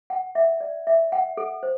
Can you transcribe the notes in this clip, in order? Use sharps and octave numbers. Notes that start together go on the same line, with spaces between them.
F#5
E5
D5
E5
F#5
A4
C5